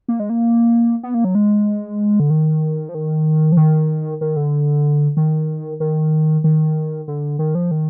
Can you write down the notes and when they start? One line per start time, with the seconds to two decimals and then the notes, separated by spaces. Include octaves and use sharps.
0.08 A#3
0.20 G#3
0.30 A#3
1.03 B3
1.14 A#3
1.24 F#3
1.35 G#3
2.20 D3
2.30 D#3
2.89 F3
2.95 D#3
3.52 F3
3.57 D#3
4.21 D#3
4.36 D3
5.17 D#3
5.80 D#3
6.44 D#3
7.08 D3
7.39 D#3
7.55 F3
7.71 D#3